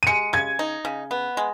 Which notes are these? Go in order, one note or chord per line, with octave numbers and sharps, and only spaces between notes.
D#7
G#3 C#7
C#3 G#6
D#4
C#3
B3
G#3